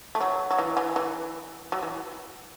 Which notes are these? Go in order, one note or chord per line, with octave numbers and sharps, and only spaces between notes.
A3
F#3
F#3
E3
E3
E3
F#3
E3